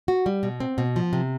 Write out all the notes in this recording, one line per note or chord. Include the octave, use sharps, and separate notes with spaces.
F#4
G3
B2
C4
B2
F3
C3